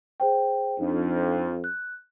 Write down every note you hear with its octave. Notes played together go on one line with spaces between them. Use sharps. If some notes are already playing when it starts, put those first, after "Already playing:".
G#4 C5 G5
F2 D4 D#4
F#6